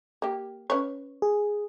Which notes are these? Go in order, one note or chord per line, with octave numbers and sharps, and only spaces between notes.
A#3 G4
C#4 B4 C#5
G#4